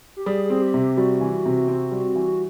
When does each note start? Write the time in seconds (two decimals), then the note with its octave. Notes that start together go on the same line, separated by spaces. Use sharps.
0.17 G4
0.26 G3 G#4
0.45 G#4
0.50 C4
0.62 G4
0.74 C3
0.80 G4
0.97 G3 F#4
1.21 E3
1.45 C3
1.68 C4
1.91 G3
2.16 E3